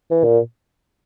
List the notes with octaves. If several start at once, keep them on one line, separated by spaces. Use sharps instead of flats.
E3
A#2